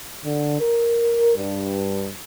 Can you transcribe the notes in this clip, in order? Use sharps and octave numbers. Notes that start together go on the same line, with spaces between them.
D3
A#4
G2